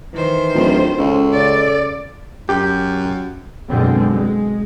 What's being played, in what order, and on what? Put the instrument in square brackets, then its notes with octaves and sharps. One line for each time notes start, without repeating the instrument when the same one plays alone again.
[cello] D#3 C5 [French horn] E3
[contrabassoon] D1 [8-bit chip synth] F4
[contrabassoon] C#2 [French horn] C#4 [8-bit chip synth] A4
[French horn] C#3 [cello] D5
[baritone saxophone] F#2 [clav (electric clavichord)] G4
[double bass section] F#2 B2 D3 G#3 C4
G#3